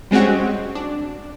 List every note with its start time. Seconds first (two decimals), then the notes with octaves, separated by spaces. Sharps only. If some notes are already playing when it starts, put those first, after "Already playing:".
0.11 G3 G#3 C4 C#4 F#4
0.75 D4